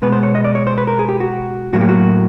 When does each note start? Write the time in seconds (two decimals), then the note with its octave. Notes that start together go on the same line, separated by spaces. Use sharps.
0.02 B2 G#3 B3 B4
0.12 C5
0.23 C#5
0.35 D#5
0.44 D5
0.55 C#5
0.67 C5
0.78 B4
0.87 A#4
0.99 G#4
1.09 G4
1.20 F#4
1.73 A2 F#3 A#3 F#4
1.81 G4
1.89 F#4